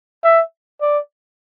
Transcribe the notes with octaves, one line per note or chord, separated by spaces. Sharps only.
E5
D5